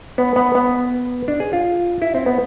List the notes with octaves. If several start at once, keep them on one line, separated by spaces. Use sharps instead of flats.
B3
B3
B3
D4
G#4
F4
E4
C4
B3